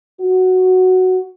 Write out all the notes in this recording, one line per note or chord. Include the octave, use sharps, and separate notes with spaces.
F#4